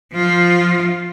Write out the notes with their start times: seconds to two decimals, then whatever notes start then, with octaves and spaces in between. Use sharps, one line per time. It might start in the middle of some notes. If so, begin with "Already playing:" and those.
0.12 F3 F4